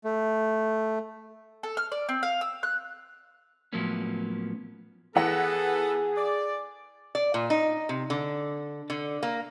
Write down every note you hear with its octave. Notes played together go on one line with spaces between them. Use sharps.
A3
A4
F6
D5
C4
F5
E6
F#6
A2 F3 F#3 A#3 B3 C#4
E3 B3 G#4 A4 F#5 A#6
D5
D5
A#2
D#4
C3
D3
D3
A#3